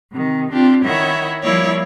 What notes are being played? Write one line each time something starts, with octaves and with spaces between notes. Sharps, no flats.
C3 D#3
C4 D4 F4 G4
D#3 E4 C#5 E5 F#5
F3 G3 A#3 E4 C#5 D5